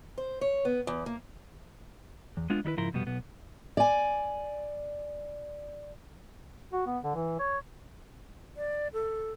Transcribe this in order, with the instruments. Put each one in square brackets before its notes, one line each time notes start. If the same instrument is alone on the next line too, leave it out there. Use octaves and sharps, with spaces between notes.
[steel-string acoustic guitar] C5
C#5
B3
E2
A#3
[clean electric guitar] E2
G#3 B3 D4 F4
D#3 G3 E4 B4
C#2 G#2 F3 E4 A#4 C6
C2 F2 B2 G3 B3
B1 B3
[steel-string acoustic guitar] D5 G#5
[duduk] F#4
B3
D3
E3
C#5
[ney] D5
A4